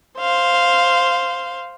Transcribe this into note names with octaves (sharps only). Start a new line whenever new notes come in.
C5 F5